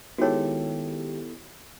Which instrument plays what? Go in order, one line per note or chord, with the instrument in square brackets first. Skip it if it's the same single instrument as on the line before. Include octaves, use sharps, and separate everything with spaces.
[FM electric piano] D#3 G#3 G4 [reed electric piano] B3 E4 A4 [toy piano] F#4 C#5